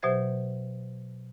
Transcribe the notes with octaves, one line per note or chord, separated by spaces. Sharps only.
B2 F#3 G4 C5 E5 G#6